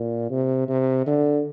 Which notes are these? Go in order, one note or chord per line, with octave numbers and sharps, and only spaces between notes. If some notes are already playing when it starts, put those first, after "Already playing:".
Already playing: A#2
C3
C3
D3